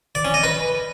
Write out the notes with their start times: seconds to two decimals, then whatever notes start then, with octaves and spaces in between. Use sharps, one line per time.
0.15 D5
0.25 C#4
0.34 D#5
0.43 B4